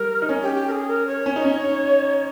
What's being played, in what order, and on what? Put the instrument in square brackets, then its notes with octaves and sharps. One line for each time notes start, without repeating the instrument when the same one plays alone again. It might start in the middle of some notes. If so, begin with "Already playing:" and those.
Already playing: [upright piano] G3 [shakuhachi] A#4
[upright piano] D#4
C#4
[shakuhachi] G4
G4
A#4
G#4
A#4
C#5
[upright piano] C#4
D#4
C#4